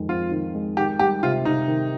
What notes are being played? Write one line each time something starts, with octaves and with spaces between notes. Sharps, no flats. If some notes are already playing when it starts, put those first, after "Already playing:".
Already playing: F2 D#3 G#3
C4 F4
D#3
G#3
D#3 G4
G3 G4
C3 F4
C3 D#4
D#3